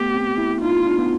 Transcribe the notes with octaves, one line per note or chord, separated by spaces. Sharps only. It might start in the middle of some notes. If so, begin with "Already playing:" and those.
Already playing: A3 B3 G4
C4
E4
D#4 F4
D4
B3